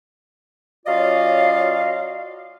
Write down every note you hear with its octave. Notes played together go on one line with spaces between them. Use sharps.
F#3 C#4 F4 D5 D#5 F5